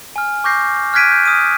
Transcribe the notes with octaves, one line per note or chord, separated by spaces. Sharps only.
G#5 F6
C#6 D6 G6 A#6 C7
F6 F#6 G#6 B6 D7 D#7
G6
D#6 F6 D#7